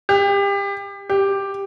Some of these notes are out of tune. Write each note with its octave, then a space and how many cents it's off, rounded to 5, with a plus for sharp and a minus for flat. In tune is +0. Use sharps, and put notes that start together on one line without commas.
G4 +30
G4 +5